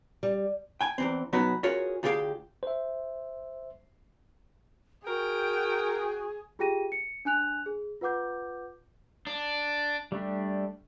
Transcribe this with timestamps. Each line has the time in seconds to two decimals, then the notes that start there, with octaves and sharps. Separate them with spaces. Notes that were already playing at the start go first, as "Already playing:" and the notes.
0.23 G3
0.81 G5 G#5
0.98 E2 E3 C4
1.33 B2 F#3 B3 D#4 F#4 B4
1.63 F4 F#4 G#4 A#4 C#5
2.03 D2 F4 G4 G#4 F5 G5
2.63 C5 E5
5.07 F#4 G#4 A#4 G5
6.59 F4 G4 G#4 G5 A#6 D#7
6.92 C#7
7.25 D4 G#5 F#6 F7
7.66 G#4
8.01 F4 B4 F#5 D6 G6
9.27 D4
10.12 G3 A3 D4 G4